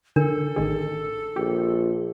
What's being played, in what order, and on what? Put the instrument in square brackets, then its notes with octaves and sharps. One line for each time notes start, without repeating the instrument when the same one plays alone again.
[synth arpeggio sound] D3 [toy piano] D4 A#4 [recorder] A4
[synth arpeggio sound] A1 D#3 G#4
[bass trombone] A#1 [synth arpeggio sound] G4